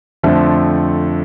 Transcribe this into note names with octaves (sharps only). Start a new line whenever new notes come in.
F2 D3 F3 A3 C4